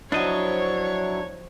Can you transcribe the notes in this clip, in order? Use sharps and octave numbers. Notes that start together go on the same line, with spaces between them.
F3 F#3 D4 E4 F#4 C#5 D#5